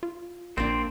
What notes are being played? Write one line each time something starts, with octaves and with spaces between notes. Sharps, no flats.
F4
A#1 A#3 C4 D4